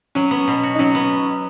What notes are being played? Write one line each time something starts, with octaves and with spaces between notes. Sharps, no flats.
F#3 C#4
B3
B2
F#4
D#4
F#3 C#4
B3